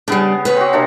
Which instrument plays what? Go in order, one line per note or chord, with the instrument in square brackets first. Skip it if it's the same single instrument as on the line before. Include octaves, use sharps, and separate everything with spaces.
[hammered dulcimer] C#3 B3 G#4 [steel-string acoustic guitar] G3 D4
[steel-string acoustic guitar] B4 C#5
[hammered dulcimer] C4 F#4
C3 A#3 D4